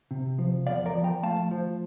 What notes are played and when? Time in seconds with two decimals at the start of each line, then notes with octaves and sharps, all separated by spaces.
0.11 C3
0.39 F3
0.67 E2 D5 F5
0.86 A#4 D5
0.95 F3
1.04 G5 A#5
1.23 A3 F5 A5
1.51 F3